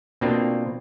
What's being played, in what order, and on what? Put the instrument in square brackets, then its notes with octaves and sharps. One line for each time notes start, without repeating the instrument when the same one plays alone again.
[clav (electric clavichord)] B2 A#3 C4 D4 F4